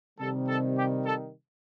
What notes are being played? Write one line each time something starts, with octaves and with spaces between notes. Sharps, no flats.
C3 D#3 G3 A4
A4
G4
A4